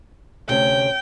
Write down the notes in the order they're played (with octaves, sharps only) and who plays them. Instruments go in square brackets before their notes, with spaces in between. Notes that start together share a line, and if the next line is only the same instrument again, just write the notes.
[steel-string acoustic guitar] D2 C3 C#4 [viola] G5